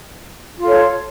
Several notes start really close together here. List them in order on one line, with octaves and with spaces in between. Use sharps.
F4 A4 C#5